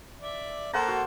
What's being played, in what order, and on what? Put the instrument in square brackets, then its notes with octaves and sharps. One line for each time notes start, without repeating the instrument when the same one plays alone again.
[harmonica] D5 E5
[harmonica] A#3 A4 [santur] C5 F#5 A#5
[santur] F#4